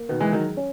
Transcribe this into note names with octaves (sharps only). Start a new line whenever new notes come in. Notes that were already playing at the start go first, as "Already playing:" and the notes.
Already playing: A#3
B2 D#3 B3
E3 G#3
D#3 F#3 G#3
C#4